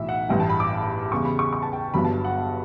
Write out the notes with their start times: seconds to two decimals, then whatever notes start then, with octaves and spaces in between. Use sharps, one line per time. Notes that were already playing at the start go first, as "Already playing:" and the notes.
Already playing: B1 A2 E3 E5
0.09 F#5
0.29 A1 G2 E3 G5
0.40 A5
0.49 B5
0.60 D6
1.12 E2 C#3 G3 C#6
1.25 B5
1.39 C#6
1.53 C#6
1.63 A5
1.73 G5
1.94 G1 G2 F#3 B3 B5
2.05 A5
2.25 F#5